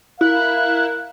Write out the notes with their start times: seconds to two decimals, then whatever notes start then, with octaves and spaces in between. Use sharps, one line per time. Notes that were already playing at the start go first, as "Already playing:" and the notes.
0.21 E4 A#4 F5 F#6